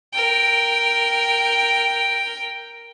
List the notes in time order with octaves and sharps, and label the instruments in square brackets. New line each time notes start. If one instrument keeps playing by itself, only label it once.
[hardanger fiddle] A#4 G5